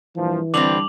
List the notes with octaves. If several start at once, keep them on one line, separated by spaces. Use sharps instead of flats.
G2 A#2 E3 F3
G2 D3 G3 C4 D6 F7 F#7